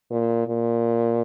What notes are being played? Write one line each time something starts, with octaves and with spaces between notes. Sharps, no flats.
A#2
A#2